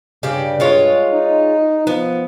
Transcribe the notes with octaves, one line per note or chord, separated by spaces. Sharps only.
G2 C#3 G4 D5
G#3 F4 C#5
D#4
F3 B3